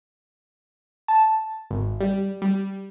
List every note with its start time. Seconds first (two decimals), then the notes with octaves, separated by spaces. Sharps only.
1.08 A5
1.71 G#1
2.01 G3
2.42 G3